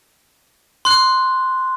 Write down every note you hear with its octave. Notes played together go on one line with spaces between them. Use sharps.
C6 F#6